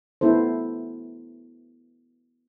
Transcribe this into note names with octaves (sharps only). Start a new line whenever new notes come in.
B3 E4 A4 C5